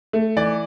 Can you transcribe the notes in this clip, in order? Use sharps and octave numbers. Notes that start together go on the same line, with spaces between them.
A3
E3 D5